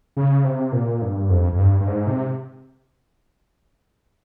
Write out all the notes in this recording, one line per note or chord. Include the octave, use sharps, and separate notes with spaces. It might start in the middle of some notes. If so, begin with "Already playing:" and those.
C#3
C3
A#2
G2
F2
F2
G2
G2
G#2
C3